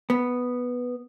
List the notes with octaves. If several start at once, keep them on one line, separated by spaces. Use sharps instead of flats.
B3